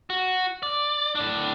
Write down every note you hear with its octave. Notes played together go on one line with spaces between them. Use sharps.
F#4
D5
A2 D4